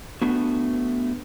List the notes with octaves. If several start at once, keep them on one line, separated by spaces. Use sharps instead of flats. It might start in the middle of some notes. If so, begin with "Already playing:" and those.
A3 B3 D4 F#4